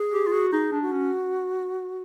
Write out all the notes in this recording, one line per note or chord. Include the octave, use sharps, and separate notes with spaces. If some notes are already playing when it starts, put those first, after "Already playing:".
Already playing: G#4
G4
F4
F#4
D#4 G#4
D4
F#4
C#4